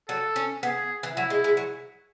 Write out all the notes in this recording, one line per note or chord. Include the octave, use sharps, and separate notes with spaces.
F#3 A4
C#4
B3 G#4
E3
F#3 E4
G#3
G#3
F#3